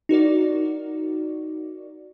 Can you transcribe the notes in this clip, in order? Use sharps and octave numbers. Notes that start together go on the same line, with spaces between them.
D#4 F#4 A#4 D5